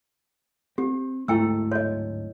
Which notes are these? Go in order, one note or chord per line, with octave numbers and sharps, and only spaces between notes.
C4 G4
D1 G#2 A3 E4 G5 E6
C#5 D#5